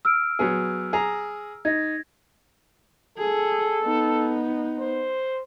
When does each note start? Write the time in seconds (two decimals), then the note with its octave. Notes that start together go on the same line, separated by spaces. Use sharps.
0.05 E6 F6 D7
0.39 F#3 B3 G#4
0.93 G#4 A#5
1.65 D#4 G#6 A#6
3.18 G#4 A4
3.83 B3 D#4
4.79 C5